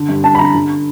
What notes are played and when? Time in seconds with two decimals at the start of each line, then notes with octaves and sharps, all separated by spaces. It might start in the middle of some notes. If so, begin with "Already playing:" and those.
Already playing: D3
0.09 G2
0.24 G2 A5
0.35 B5
0.39 D3 A#5
0.54 D3